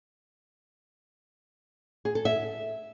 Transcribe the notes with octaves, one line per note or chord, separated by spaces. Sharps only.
G#4
A4
E5